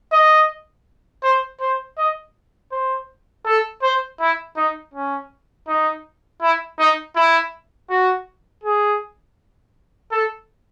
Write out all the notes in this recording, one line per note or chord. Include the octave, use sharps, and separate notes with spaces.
D#5
C5
C5
D#5
C5
A4
C5
E4
D#4
C#4
D#4
E4
D#4
E4
F#4
G#4
A4